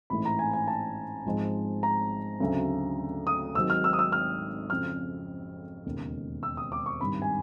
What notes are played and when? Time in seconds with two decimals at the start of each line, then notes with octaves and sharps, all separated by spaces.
0.10 A1 G#2 E3 A3 C4 B5
0.25 A#5
0.39 G#5
0.53 G#5
0.68 A5
1.26 G#1 G#2 F3 G#3
1.83 A#5
2.40 D2 C#3 F#3 A3 C4
3.27 D#6
3.55 G#1 G#2 D#3 F#3 E6
3.70 F6
3.84 E6
3.93 D#6
3.99 E6
4.12 F6
4.70 F2 C#3 F3 F6
5.86 E1 D#2 C#3
6.43 E6
6.57 D#6
6.72 D6
6.86 C#6
7.00 G#1 G2 D#3 G3 B5
7.22 G#5